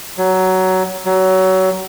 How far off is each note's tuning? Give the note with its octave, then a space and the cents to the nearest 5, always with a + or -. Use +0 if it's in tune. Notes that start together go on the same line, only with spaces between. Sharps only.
F#3 +15
F#3 +25